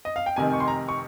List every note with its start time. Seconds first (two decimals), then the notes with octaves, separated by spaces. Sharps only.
0.05 D#5
0.16 F5
0.26 G5
0.36 F1 F2 C3 D#3 G#5
0.53 C#6
0.60 C6
0.68 A#5
0.89 C#6